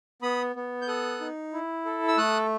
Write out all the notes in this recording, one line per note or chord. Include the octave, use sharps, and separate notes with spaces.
B3 B5 D#6
B3
G6
A4 D#6 F#6
D#4
E4
A4
E6
A3 D#6 F#6